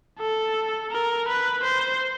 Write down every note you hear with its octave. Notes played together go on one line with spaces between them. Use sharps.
A4
A#4
B4
C5